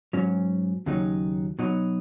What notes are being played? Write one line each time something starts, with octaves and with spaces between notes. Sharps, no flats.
G#2 F#3 C#4
D#2 C#3 F#3 D#4
B2 F#3 D#4